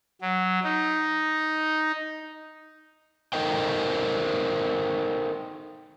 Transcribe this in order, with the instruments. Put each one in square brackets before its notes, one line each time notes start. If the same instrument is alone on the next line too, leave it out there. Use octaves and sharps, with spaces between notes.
[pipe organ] F#3
D#4
[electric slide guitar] D#4 A4 A#4 C5 D#5 G5